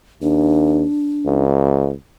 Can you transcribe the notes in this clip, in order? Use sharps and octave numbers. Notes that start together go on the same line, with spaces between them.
D#2 D4
C#2